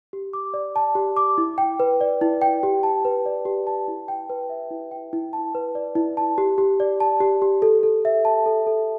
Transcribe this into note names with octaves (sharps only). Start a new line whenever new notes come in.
G4
D6
D5
A5
G4
D6
E4
G5
B4
D5
E4
G5
G4
A5
B4
D5
G4
A5
E4
G5
B4
E5
E4
G5
E4
A5
B4
D5
E4
A5
G4
G4
D5
A5
G4
G4
A4
A4
E5
A5
A4
A4